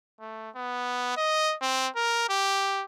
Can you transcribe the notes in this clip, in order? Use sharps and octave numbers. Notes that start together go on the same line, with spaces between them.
A3
B3
D#5
C4
A#4
G4